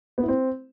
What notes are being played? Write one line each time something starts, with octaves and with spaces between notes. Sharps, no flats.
B3
E4
C4